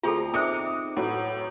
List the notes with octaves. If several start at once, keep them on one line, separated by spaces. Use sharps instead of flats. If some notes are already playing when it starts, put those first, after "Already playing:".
D2 C4 F4 G#4 A4 A#5
C4 D#4 C5 D5 E5 D6 D#6 C#7
A2 F#3 B4